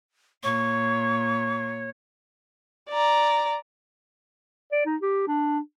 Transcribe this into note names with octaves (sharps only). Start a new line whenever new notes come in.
A#2 C#5 C#6
D5 A#5
D5
D#4
G4
D4